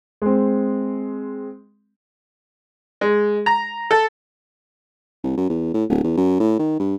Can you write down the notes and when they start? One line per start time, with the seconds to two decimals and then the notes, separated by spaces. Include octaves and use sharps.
0.22 G#3 C4
3.01 G#3
3.46 A#5
3.91 A4
5.24 C2
5.37 F#2
5.50 E2
5.74 A2
5.90 D1
6.04 E2
6.17 F#2
6.40 A2
6.59 D#3
6.80 G2